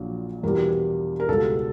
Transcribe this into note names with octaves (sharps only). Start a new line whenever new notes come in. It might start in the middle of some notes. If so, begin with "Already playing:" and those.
Already playing: A#1 A#2 F#3
E2 B2 G3 A#4
A#4
C#2 B2 G3 A4